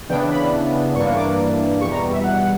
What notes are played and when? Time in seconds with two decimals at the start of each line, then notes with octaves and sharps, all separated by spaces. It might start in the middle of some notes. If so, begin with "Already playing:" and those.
0.09 C#3 E3 B3 D4 G5
0.30 B5
0.95 G2 E3 A#3 D4 C#6
1.17 D6
1.81 E2 B2 G3 C#6
1.91 A#5
2.13 E5
2.24 F#5